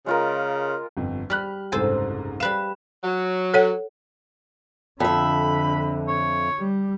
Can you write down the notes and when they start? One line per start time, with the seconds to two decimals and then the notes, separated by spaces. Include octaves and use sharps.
0.06 C#3 G#3 F4 A#4
0.97 G1 F2
1.30 G3 B5 F6 F#6
1.72 F#1 C2 G#2 A4 C5 G#5
2.40 G3 B4 F5 E7
3.04 F#3
3.54 A4 C#5 F#5
5.00 F2 D3 E5 B5
6.08 C#5
6.59 G3